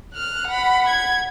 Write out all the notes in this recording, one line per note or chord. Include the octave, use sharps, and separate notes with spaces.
F6 F#6
F#5 B5
G#6